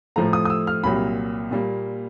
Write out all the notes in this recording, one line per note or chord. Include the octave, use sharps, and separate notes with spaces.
A2 F3 A3 A#5
D#6
D#6
E6
F6
C2 A#2 F#3 A#3 B5
A#2 G3 A#3